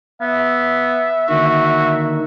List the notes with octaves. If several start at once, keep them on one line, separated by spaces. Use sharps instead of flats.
B3 E5
D3 D#3 A#3 F#4